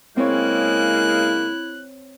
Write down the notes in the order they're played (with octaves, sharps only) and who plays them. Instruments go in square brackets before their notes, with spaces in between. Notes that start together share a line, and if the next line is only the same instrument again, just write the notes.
[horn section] C#3 G#3 A#3 [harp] C4 C#5 [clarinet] E4 [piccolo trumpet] F#6